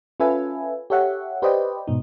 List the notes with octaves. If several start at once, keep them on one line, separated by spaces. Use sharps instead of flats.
C#4 F4 A4 B4 E5 G#5
G4 A4 C#5 E5 F#5
G4 B4 C5 D5 D#5 G5
G#2 B2 D#4